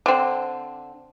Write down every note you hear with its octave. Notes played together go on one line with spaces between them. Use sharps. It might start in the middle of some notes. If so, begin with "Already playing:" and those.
D3 C4